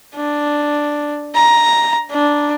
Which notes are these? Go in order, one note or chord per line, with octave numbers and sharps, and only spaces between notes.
D4
A#5
D4